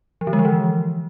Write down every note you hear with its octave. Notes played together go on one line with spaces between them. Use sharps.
F3
D3
G#3
F3
E3